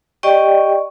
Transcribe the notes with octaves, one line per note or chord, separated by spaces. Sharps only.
G4 D5 D#5 G5 C#6